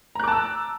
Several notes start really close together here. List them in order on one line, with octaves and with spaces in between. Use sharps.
A#5 F#6 D6 A5 E6